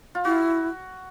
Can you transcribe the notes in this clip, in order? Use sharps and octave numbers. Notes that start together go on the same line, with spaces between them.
F4
E4 F#4